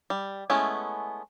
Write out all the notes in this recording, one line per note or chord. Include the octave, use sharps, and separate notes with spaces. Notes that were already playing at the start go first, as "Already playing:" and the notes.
G3
G#3 A3 B3 C#4 E4